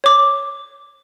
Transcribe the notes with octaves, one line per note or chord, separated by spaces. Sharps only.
C#5 D6